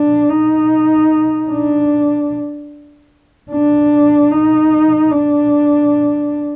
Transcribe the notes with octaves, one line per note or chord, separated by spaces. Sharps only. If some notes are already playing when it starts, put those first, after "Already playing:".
Already playing: D4
D#4
D4
D4
D#4
D4